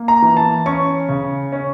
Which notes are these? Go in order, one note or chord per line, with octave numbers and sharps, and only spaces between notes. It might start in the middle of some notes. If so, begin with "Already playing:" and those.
Already playing: A#3
A#5
E3
A5
C#4 C#6
C#3
C#4